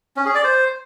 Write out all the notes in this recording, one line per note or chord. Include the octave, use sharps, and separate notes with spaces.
C#4
G#4
D5
C5